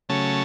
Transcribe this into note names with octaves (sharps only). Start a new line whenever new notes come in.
C#3 F#3 A3 C#4 A5